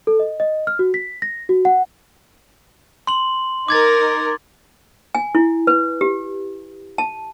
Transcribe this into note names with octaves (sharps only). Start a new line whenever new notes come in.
A4
D#5
D#5
F6
F#4
B6
A#6
F#4
F#5
C6 F#7
D#4 A#4 D6 G#6 A6
G#5
E4
B4
G4
A5